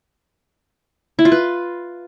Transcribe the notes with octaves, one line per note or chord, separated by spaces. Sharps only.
E4
F4
B4